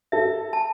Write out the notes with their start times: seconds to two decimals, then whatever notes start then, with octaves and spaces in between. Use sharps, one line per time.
0.12 A4 E5
0.53 A5